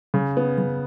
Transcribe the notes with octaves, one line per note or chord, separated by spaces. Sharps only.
C#3
B3
C#3